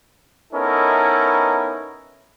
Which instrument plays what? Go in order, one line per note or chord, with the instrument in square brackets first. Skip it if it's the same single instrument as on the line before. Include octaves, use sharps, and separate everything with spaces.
[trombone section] B3 C#4 D#4 E4 A4 A#4